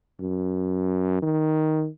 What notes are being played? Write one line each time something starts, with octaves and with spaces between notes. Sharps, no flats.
F#2
D#3